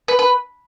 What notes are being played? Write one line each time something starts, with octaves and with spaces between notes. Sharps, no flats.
B4
B4